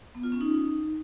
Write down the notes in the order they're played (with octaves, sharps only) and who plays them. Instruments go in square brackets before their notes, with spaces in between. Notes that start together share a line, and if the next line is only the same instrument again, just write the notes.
[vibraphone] B3
F4
C#4
D#4